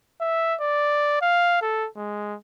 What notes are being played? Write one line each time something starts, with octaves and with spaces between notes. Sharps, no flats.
E5
D5
F5
A4
G#3